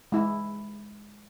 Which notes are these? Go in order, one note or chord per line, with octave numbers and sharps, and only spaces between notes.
G#3 E4